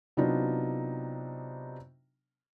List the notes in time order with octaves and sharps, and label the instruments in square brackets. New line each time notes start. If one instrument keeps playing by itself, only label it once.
[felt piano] C3 F#3 B3 D4 D#4 F4